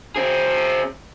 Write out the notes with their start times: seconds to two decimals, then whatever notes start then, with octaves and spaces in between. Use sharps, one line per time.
0.16 C4 G#4